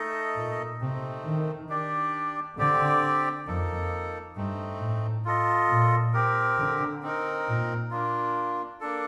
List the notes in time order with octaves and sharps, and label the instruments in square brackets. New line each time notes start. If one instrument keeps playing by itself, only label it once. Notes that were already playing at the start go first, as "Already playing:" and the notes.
Already playing: [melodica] A3 D#4 A4 D#5
[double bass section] A#2
[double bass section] C3 [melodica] A3 C4 D#4
[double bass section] D#3
[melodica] D4 G4 D5
[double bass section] D3 [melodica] C4 G4 D5
[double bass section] F2 [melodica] A#3 D#4 A4
[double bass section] G2 [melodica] A3 C4 D#4
[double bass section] A2
[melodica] F4 A4 D#5
[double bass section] A#2
[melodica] C4 G4 A#4
[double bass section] D3
[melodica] C4 D#4 A#4
[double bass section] A#2
[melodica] A#3 D4 F4
A#3 D4 A4